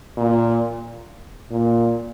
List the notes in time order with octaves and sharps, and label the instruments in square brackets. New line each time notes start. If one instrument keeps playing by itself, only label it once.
[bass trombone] A#2
A#2